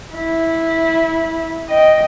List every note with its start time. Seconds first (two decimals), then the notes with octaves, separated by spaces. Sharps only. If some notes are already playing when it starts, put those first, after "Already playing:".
0.14 E4
1.70 D#5 G5